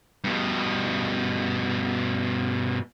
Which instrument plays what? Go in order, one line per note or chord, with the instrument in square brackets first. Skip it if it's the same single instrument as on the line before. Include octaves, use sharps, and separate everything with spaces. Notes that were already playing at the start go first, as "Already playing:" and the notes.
[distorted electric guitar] G2 B2